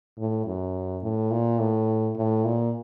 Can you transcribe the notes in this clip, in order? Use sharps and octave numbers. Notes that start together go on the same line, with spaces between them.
A2
F#2
A2
A#2
A2
A2
A#2